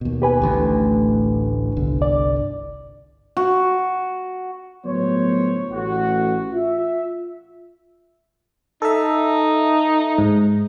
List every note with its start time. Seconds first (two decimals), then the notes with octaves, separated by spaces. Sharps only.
0.01 D#2 B2
0.22 G4 B4 G#5
0.42 A1 D2 A2
1.77 G1 C2 D3
2.02 D5
3.37 F#4
4.85 G1 A2 F#3 B3 C5 C#5
5.71 A1 F#4
6.53 F4 E5
8.82 D#4 A4 E5
10.18 G#2